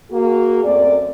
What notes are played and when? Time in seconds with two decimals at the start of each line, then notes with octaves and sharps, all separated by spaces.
0.11 A#3 F#4 G#4
0.64 F#2 A3 C4 D5